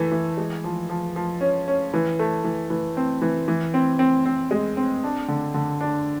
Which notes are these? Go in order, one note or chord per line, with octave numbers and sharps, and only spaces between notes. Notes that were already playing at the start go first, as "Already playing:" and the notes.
Already playing: E3 A3
E3
G#3
F3
F3
F3
C#4
C#4
E3
A3
E3
E3
C4
E3
E3
C4
C4
C4
G#3
C4
D4
D3
D3
D4